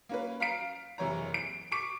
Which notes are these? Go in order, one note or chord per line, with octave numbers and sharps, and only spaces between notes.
A#3 C#4 B4
F5 A#5 B6 C7 D7
F#1 C3 E3 C#5 A#5
D7
C#6 D6 B6 D7